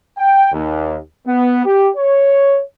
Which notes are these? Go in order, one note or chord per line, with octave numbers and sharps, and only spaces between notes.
G5
D#2
B3
G4
C#5